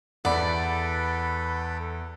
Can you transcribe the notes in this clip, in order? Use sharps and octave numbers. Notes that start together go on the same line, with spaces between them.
E2 A4 B4 D5 F#5 B5